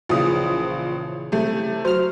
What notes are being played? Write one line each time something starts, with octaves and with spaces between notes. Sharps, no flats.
A#1 A#2 C#3 E3 F3 D#6
C3 A3
F#3 C5 F6